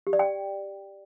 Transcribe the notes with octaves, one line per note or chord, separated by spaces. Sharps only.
G4
D5
G5